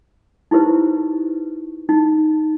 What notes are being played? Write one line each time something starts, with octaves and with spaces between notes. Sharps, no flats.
D#4 E4 G4 B4 C5
D#4